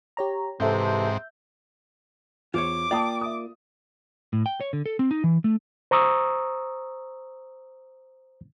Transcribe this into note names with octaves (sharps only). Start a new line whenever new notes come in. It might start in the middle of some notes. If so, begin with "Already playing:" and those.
G4 C#5 A#5
G#2 C3 E3 C4 A4 E5 G6
E2 F4 C5 C#5 D6
A#3 F4 D5 G5 A5 D#6
E5 D#6
A2
G5
C#5
D3
A4
C4
D#4
E3
A3
C5 A#5 C#6 D#6 E6